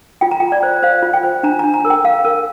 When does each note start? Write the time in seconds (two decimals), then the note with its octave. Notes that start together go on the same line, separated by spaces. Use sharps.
0.21 F4 G5
0.31 A#5
0.40 F4 G5
0.52 D5
0.63 C5
0.83 C5 F5
1.03 F4
1.14 G5
1.23 C5
1.43 D4 A#5
1.59 D4 A#5
1.74 A#5
1.85 A#4
1.90 G5
2.05 A#4 F5
2.25 A#4